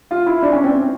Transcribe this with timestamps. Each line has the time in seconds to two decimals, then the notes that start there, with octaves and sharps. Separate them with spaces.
0.11 F4
0.26 E4
0.43 D4
0.53 C#4
0.64 C4